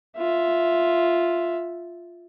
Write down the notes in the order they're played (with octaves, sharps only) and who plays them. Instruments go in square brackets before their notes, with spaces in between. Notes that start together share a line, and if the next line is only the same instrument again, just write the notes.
[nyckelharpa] F4 E5